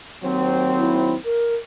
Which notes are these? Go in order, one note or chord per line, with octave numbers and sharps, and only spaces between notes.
D#2 F#3 C4
E4
A#4